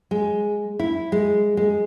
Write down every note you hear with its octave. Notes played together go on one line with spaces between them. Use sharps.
G#3
E4
G#3
G#3